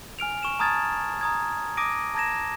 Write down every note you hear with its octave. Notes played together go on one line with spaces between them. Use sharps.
G#5 F6 D7 F7
C#6 E7
A5 A#5 D#6 F6 G#6 A6
A#5 D#6 G#6
D6 D#6 A#6 D7 D#7
A5 A#5 G#6 A#6 E7